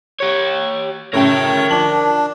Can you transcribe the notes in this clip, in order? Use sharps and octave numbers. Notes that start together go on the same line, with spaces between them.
G4 C#5
F#2 A2 C#3 A#4 C#5 G5
F3 D4 F#7